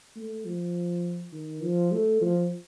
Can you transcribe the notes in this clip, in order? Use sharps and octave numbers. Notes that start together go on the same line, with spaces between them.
A3
F3
D#3
F3
A3
F3